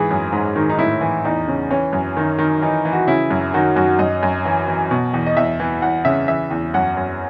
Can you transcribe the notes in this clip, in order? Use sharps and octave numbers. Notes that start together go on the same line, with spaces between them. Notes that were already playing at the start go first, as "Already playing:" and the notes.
Already playing: G#2 E3 G#4
F#2
G#2
D#3
D#4
A2 E4
E3
E2 D#4
C#3
E3 C#4
F#2
D#3
D#3
E3 D#4
E3
F#4
C#3 E4
F#2
D#3 F#4
F#2 F#4
F#2 D#5
F#2
E3
E3
B2
E2
D#5
E2 E5
E3
E2 F#5
C#3 E5
E3 E5
E2
F#2 F#5
F#2